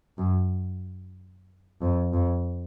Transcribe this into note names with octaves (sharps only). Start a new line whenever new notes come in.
F#2
F2
F2